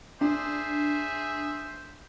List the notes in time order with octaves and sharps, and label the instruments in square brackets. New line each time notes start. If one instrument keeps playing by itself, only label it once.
[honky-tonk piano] D4 [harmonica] G#4 C5 E5